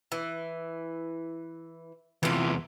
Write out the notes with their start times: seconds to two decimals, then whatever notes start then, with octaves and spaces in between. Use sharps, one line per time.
0.12 E3
2.23 E2 C3 E3 F4